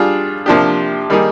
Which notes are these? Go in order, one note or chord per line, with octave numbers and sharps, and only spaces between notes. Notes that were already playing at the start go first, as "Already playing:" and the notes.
Already playing: G3 D4 F4 G#4
C3 F3 A#3 D4 G4
D#3 G3 A#3 D#4 G#4